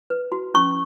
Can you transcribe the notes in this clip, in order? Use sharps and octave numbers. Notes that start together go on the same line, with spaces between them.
B4
F#4
C#4 C#6